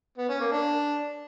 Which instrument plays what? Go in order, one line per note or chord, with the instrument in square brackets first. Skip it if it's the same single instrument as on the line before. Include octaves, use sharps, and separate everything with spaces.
[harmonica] B3
C#4
A#3
D4